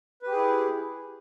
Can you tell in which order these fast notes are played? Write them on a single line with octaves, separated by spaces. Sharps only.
B4 G4 G#4 E4